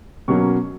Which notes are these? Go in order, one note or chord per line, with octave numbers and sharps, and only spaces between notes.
B2 F#3 A#3 C#4 C#6